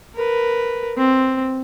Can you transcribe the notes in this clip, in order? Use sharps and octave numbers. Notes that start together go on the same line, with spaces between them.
A#4 B4
C4